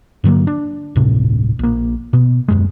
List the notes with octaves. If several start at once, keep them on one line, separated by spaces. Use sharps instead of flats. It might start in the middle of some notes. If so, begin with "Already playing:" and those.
G2 D3 F#3 A#3
D4
D1 G1 A2 C3
A#1 A#3
B2 B3
D#1 F#2 G#3